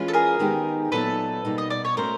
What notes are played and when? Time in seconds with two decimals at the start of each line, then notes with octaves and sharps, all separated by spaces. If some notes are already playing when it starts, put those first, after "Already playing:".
Already playing: E3 G#3 C#4 F4
0.08 A4
0.13 G#4 A#4
0.39 D#3 G#3 B3 D#4 G4
0.92 A#2 F#3 B3 D#4 A4 B4
1.45 B2 G3 A#3 D#4
1.58 D#5
1.70 D5
1.85 C#5
1.97 A3 C#4 F#4 A#4 C5